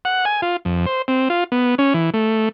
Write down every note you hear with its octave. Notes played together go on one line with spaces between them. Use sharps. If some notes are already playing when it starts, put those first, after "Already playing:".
F#5
G#5
F4
F2
C5
C4
F4
B3
C#4
E3
A3